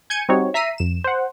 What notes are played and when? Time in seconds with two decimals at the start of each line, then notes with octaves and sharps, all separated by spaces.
0.10 G#5 G6 G#6 C#7 D#7
0.29 G3 C4 D#4 F#4 C#5
0.54 E5 A#5 B6 C7 D#7
0.78 F2 E7
1.04 C5 F#5